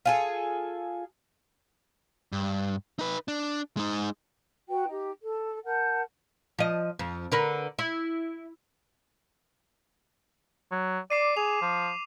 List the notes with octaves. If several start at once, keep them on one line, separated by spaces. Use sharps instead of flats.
F4 G#4 A4
G2
D#4 B4
D4
G#3 D#4
F#4 B4 G5
D#4 G4
A4
A#4 F#5 A5 G6
F3 D#5
F2
D3 A#4 B4
E4
F#3
D5 D6 C7 D#7
G#4 F7
F3